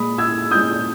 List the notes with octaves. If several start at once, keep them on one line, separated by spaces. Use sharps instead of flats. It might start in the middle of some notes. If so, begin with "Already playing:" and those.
Already playing: A#2 G#3 B5 D#6
E6 G#6
A#2 G#3 D#6 G6